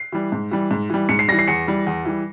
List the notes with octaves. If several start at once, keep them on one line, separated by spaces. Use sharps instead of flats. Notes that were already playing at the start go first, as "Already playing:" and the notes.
Already playing: C7
E3 G3
G#2
E3 G3
G#2
E3 G3
G#2 C#7
C7
E3 G3 A#6
C7
E2 C#7
E3 G3
E2
E3 G3